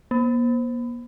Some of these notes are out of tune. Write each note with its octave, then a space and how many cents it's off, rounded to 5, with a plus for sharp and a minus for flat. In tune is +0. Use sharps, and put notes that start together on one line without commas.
A#3 +45